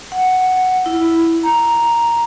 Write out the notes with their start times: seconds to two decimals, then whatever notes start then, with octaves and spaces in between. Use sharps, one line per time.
0.12 F#5
0.86 E4
1.43 A#5